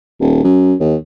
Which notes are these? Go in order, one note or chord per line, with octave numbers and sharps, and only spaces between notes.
D#1
F#2
D#2